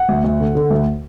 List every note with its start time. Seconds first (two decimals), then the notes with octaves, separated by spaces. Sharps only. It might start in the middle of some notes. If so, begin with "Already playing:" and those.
Already playing: F#5
0.09 D2
0.24 D2
0.40 D3
0.55 D3
0.70 D2